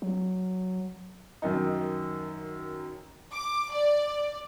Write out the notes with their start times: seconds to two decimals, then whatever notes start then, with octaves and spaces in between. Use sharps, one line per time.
0.02 F#3
1.42 F#2 D#3 D#4
3.32 D6
3.72 D5